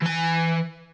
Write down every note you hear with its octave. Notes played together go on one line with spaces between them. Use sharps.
E3 G#5